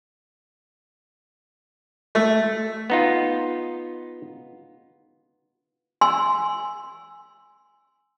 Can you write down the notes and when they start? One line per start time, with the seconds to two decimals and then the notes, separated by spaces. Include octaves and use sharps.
2.15 A3
2.90 B3 D#4 F4
6.01 G#5 C6 E6